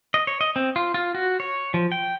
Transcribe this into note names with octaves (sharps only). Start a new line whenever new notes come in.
D#5
C#5
D#5
C4
F4
F4
F#4
C#5
F3
G5